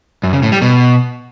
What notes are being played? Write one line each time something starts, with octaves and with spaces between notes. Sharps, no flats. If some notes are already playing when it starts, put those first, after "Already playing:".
F#2
C#3
A2
G3
B2